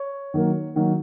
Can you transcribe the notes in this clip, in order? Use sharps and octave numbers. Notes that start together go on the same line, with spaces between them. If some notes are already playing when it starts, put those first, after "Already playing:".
Already playing: C#5
D#3 F#3 A#3
D#3 F#3 A#3